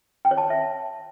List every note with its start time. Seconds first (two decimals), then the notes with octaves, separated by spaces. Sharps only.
0.25 G5
0.31 C#5
0.38 A5
0.44 C#5
0.50 E5